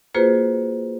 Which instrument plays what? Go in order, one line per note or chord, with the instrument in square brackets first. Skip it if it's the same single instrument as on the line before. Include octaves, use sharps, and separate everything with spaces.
[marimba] A#3 F4 F#4 G#4 B4 C5